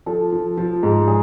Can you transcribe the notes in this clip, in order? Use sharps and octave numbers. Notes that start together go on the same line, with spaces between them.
F3 A4
F3
F3
G#2
G#4